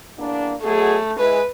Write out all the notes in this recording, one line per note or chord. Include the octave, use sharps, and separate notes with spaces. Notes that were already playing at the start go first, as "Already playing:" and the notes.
E2 A#3 D4
B2 F#3 A3 G#4
G#3 E4 B4